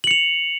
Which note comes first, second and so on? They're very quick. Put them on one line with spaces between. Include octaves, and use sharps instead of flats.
F#7 C#7 F7